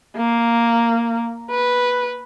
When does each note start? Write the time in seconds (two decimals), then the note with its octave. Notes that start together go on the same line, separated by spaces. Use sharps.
0.17 A#3
1.51 B4